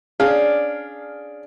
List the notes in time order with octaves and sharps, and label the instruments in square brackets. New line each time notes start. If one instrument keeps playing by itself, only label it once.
[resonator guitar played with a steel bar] C#4 D4 [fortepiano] G#4 F5